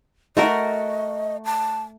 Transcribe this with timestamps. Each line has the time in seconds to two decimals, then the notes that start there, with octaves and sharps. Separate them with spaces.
0.37 A3 F#4 A#4 D#5
1.45 A5